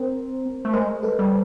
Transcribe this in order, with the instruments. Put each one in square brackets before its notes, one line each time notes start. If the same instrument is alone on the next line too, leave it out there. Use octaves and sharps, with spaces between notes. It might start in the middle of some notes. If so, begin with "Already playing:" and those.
Already playing: [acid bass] C4 [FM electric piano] A#4 C5
[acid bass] A3
[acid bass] G#3 [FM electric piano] A#4 C5
[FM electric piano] A4 B4
[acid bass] G3